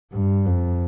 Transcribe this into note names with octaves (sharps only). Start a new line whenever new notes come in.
G2
F2